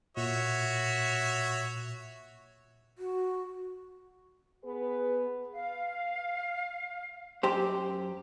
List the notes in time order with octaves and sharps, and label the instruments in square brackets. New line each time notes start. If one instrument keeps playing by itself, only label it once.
[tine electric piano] A#2 [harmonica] F#4 C#5 E5
[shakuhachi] F#4
[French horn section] B3 G#4 B4
[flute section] F5
[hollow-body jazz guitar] F#2 G4 C5